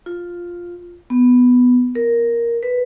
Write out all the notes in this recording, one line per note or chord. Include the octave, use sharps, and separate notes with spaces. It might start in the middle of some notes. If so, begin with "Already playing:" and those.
F4
B3
A#4
B4